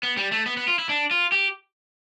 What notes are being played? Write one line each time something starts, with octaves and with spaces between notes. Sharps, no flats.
B3
G3
A3
B3
B3
F4
E4
D4
F4
G4